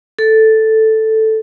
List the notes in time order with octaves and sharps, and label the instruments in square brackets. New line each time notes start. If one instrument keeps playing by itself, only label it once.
[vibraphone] A4